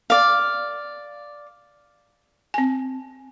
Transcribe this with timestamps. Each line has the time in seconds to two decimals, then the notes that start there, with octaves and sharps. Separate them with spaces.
0.10 D5 F5
2.54 C4 G#5